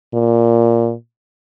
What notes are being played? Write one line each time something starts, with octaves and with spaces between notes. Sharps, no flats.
A#2